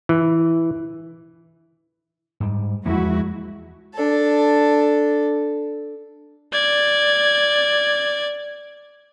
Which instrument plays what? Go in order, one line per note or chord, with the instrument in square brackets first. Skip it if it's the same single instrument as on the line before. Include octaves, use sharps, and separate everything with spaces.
[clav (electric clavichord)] E3
[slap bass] G#2 G3
[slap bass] E2 F3 A#3 [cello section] G#3 E4 F#4
[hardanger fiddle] D4 A4
[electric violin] D5 G#6